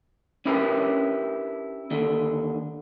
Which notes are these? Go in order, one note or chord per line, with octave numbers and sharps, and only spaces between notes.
C#4 D4 E4 G4 A#4 B4
D#2 D3